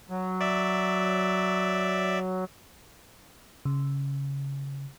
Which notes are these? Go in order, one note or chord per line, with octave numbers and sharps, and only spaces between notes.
F#3
D5 E5
C#3